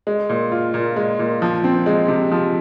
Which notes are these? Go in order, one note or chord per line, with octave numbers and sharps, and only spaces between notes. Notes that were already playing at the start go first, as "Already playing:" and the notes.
G#3
A#2
F4
A#2
G#3
A#2
F3
C4
G#3
C3
F3